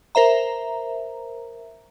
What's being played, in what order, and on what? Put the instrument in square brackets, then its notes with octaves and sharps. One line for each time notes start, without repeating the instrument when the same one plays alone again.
[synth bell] A#4 C5 E5 A#5